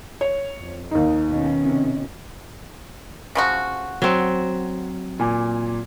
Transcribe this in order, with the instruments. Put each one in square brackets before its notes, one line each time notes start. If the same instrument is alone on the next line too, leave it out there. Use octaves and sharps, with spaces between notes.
[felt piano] C#5
[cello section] F2
[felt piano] D#2 D#4
[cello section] B2 D#3 C#4
[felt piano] C3
[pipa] C#3 F3 F#4
[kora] F#3 C4
[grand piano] A#2 G#5 D6